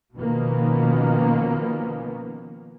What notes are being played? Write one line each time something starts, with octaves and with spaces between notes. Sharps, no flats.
B2 D#3 F3 A#3 B3 C#4